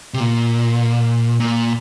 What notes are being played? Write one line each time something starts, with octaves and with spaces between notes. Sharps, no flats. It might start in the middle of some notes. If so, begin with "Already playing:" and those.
C3
A#2
A#2